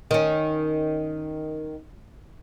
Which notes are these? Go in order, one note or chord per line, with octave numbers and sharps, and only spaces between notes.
D#3 C#4